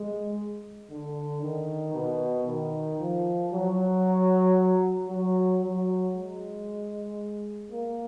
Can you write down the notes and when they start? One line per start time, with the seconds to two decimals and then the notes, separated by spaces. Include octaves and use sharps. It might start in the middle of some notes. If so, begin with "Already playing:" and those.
Already playing: G#3
0.90 D3
1.42 D#3
1.94 B2
2.47 D#3
3.00 F3
3.52 F#3
5.09 F#3
5.62 F#3
6.15 G#3
7.72 A#3